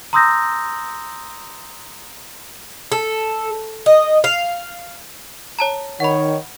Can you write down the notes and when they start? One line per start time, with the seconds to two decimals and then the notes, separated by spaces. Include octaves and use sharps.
0.13 A#5 C6 D#6 E6 G6 A#6
2.92 A4
3.86 D#5
4.24 F5
5.59 C#5 A5 A#5
6.00 D#3 C#5 F#5 B5